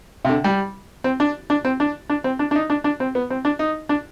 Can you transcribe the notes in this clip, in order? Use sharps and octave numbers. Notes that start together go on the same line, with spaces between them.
C3
D3
G3
C4
D4
D4
C4
D4
D4
C4
D4
D4
D#4
D4
D4
C4
B3
C4
D4
D#4
D4